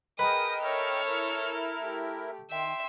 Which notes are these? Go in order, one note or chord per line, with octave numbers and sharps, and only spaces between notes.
G#4 A#4 B4 D#5 G5 D#6
A4 C#5 E5 F6
E4 A#4
A3 G4
D#3 E5 G5 C6